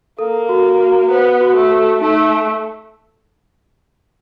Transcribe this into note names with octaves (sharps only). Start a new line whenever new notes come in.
A#3 A4
F#4
F#4
B3 C5
F#4
A3
A4
A3 D#4